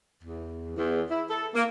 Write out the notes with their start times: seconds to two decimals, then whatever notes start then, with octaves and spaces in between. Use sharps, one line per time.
0.23 E2
0.77 E2
1.10 E4
1.29 A4
1.55 A#3